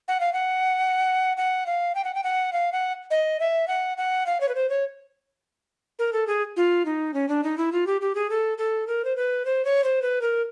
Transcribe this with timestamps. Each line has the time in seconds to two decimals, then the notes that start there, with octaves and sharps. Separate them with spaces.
0.08 F#5
0.20 F5
0.33 F#5
1.37 F#5
1.66 F5
1.95 G5
2.04 F#5
2.15 G5
2.24 F#5
2.53 F5
2.72 F#5
3.11 D#5
3.40 E5
3.68 F#5
3.98 F#5
4.26 F5
4.41 C#5
4.49 B4
4.55 C5
4.69 C#5
5.99 A#4
6.13 A4
6.27 G#4
6.57 F4
6.85 D#4
7.14 C#4
7.29 D4
7.43 D#4
7.58 E4
7.72 F4
7.87 G4
8.01 G4
8.15 G#4
8.30 A4
8.58 A4
8.87 A#4
9.05 C5
9.16 B4
9.45 C5
9.65 C#5
9.84 C5
10.02 B4
10.21 A#4